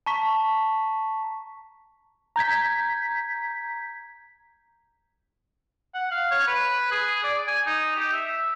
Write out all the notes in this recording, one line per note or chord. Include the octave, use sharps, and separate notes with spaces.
A5 A#5 C#6 B6
A#5 G6 G#6 B6
F#5
F5
C#5
B4
G#4
D5
G#5
D#4
G4
E5